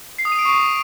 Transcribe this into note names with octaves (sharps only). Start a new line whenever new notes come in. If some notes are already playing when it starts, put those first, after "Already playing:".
C7
D#6
D#7
D7
C#6